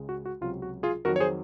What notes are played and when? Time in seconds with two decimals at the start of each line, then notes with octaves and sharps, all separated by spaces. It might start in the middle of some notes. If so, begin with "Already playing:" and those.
Already playing: C#2 C#3 G#3
0.09 F#4
0.25 F#4
0.41 C#2 C3 F#3 F4
0.62 F#4
0.83 F4 G#4
1.05 F2 D#3 F#3 F#4 A#4
1.16 C#5
1.20 G#4 C5